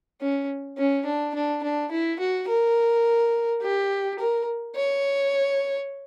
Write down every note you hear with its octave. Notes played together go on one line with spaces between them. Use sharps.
C#4
C#4
D4
D4
D4
E4
F#4
A#4
G4
A#4
C#5